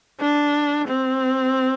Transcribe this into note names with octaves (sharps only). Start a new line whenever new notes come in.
D4
C4